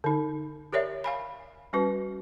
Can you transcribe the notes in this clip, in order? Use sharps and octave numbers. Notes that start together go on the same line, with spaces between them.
D3 D#4
G4 A#4 C#5 D5 E5
F5 G#5 B5
G3 C#4 F#4 B4